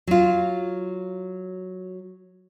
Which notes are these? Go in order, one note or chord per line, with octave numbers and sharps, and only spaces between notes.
F#3 F4